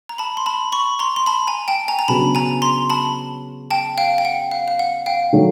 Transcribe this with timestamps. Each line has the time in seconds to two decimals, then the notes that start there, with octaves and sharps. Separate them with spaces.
0.09 A#5
0.18 A5 B5
0.37 C6
0.46 A5 B5
0.72 B5 C#6
0.99 A#5 C6
1.16 C6
1.26 A5 B5
1.47 G#5 A#5
1.68 G5 A5
1.88 G#5 A#5
1.99 A#5
2.08 C#3 F#3 B3 D4 F#4 A5 B5
2.35 G#5 A#5
2.62 A#5 C6
2.90 A5 B5
3.71 G5 A5
3.98 F5 G5
4.18 G5
4.25 F#5
4.51 F5
4.68 F5
4.79 F#5
5.06 F5 G5
5.33 D#3 F#3 A3